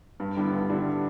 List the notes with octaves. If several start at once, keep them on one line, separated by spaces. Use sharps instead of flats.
G2
D3 G3 B3 E4
G2
D3 G3 B3 E4